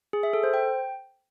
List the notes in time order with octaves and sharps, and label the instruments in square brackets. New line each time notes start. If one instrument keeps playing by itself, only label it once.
[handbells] G#4
E5
A4
C5
G5